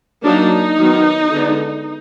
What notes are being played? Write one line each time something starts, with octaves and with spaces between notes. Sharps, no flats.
F#3 A#3 D4 D#4
D#3 F#3 B3
D3 G#3 B3 D4